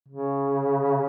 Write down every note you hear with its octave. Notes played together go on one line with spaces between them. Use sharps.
C#3